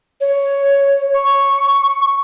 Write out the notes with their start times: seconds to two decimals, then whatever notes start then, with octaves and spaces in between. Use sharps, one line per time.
0.21 C#5
1.15 C#6